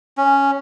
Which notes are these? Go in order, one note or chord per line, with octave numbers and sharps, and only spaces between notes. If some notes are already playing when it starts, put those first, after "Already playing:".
C#4